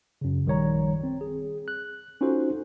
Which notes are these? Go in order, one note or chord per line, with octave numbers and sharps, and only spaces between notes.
F#2 C#3
A#1 D#3 G3 C#5 A#5
C4
G#4
F#6
C#4 D#4 F4 F#4 A4 C5